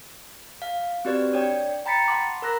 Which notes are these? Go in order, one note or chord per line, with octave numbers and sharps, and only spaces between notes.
F5
C4 F#4 G4 B4 D5
D4 C#5 D5 G5
G5 A#5 B5 A6 B6 C#7
F#5 A5 B5 C6 D6
A#4 A#5 F#6 A#6